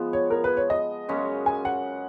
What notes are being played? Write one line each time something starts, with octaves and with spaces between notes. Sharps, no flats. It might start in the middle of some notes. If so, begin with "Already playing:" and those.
Already playing: F3 G#3 B3
C#5
A#4
B4
C#5
D#5
F#2 C#3 G#3 C#4
G#5
F#5